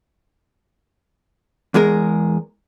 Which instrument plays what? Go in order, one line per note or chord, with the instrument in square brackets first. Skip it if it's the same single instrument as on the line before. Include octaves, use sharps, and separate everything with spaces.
[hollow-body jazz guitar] E2 G#3 G#4 A#4